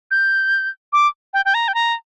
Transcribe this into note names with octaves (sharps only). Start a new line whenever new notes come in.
G6
D6
G5
G5
A#5
G5
A#5